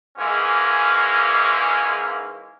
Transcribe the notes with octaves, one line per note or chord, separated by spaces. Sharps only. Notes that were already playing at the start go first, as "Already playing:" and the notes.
G#2 E3 G#3 A#3 C#4